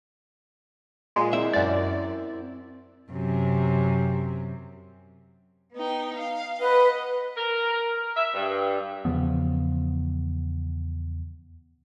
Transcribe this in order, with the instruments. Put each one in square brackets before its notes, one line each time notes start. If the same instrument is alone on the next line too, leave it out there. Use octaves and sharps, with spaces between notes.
[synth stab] A#2 G#3
[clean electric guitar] C4 E4 E5
[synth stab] F#2 D5
[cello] F#2 C3
[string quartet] B3 D#4 G5
F5
[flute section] B4 [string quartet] D#5 F#5
[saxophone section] A#4
E5
G2
[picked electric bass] E2 C#3 F3 B3